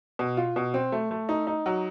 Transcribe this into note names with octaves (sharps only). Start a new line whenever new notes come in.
B2
F4
B2
C4
A3
A3
D#4
D#4
F#3